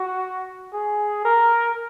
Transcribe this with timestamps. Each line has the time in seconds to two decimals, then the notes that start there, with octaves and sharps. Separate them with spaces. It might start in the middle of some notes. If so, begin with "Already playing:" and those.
Already playing: F#4
0.73 G#4
1.25 A#4